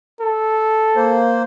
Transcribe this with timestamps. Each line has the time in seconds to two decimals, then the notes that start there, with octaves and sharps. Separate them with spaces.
0.21 A4
0.96 A#3 C5